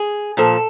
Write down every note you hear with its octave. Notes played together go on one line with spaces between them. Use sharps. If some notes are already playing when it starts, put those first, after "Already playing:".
Already playing: G#4
A#2 F3 A4